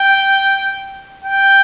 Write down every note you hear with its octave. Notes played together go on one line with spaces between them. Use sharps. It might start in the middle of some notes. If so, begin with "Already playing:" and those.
Already playing: G5
G5